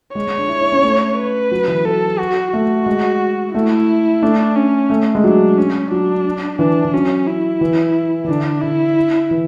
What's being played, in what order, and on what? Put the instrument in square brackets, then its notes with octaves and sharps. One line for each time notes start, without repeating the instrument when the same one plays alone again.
[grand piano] G#3 [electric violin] C#5
[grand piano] G#3
D4
E4
E4
C#4
A3
[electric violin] B4
[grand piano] F#3
E3
[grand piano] F#3 [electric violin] A4
[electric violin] F#4
[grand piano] A3 [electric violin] F#4
[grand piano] G#3
[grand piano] A3 [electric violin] E4
[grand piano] A3 [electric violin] D4
[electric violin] C#4
[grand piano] A3
G#3
[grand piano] F#3 [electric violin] D4
[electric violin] C#4
[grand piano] F#3 [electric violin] D4
[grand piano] E3 [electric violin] D4
[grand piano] E3
[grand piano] F#3 [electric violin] C#4
[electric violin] E4
[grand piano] E3
E3
[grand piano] D3 [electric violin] D4
[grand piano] D3 [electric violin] E4
[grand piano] E3